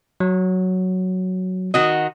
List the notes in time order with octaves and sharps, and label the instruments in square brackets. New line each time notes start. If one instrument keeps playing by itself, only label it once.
[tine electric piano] F#3
[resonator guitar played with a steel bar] D#3 F#4 D#5